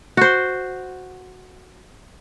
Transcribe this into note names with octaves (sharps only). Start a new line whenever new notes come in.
F#4 C5